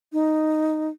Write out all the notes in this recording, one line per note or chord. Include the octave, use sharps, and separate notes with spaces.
D#4